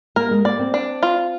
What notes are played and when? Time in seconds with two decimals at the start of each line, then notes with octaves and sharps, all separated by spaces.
0.16 A#3 A#4
0.31 G#3
0.45 A#3 D5
0.59 C4
0.74 D4
1.03 F4